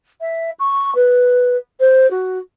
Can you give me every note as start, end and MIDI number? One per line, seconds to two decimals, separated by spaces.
0.21 0.50 76
0.59 0.94 85
0.95 1.57 71
1.80 2.09 72
2.11 2.39 66